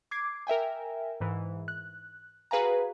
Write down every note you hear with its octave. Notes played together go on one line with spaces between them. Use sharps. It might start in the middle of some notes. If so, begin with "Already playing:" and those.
D6 G#6 C7
A#4 E5 G5 G#5
G#2 E3
F#6
F#4 G#4 B4 F5 G#5 A#5